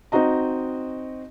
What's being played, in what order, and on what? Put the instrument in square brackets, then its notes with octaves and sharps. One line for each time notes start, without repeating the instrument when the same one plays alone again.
[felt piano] C4 D#4 F#4 D#5 A#5